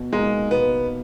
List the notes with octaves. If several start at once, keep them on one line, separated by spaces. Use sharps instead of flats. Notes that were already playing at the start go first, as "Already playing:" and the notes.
Already playing: B2
G#3 A#3 D#4
B2 B3